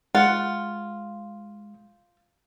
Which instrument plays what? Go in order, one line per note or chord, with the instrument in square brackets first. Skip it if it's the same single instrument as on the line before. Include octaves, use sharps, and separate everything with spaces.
[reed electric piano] G#3 [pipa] F4 [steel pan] F#5